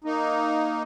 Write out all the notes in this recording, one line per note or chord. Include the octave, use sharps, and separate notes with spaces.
A#3 D#4